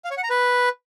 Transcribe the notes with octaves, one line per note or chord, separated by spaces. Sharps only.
F5
C#5
F#5
A#5
B4